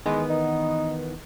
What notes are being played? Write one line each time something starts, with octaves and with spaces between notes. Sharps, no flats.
D#3 E3 G#3 B3
D#4